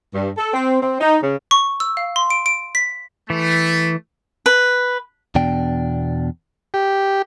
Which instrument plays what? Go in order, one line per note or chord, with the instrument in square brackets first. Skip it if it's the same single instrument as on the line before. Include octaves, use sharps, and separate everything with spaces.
[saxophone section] G2
A4
C4
C4
D#4
C#3
[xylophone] C#6
E6
F5
C6
D7
D7
B6
[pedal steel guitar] E3 [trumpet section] A3
[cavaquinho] B4
[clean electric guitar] E2 B2 D4 G5
[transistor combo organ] G4